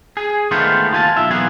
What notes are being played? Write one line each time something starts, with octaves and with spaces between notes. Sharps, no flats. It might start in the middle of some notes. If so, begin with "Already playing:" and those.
G#4 G#5
D#3 G#3 A3 B3 F4 C5
D#2 F4 G#5 A5
B1 F4 E5
B1 E2 A#3 B3 G#4 G#5